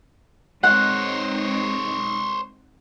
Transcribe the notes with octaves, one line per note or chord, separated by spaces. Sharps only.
G#3 C4 D#4 C5 C#5 F#5